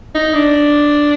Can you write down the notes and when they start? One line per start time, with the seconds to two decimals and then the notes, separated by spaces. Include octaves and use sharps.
0.15 D#4
0.34 D4